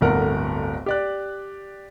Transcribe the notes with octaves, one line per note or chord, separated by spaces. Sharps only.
D1 G1 A3 A#4 F#5
G4 D5 F#6